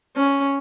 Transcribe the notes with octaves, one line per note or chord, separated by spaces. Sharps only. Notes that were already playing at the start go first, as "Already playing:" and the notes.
C#4